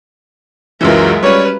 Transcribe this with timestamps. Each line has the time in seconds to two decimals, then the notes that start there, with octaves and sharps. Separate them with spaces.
0.81 C#2 F#2 E3 F#3 G#3 F4 A#4 E5
1.23 G3 C#4 B4 C#5 D5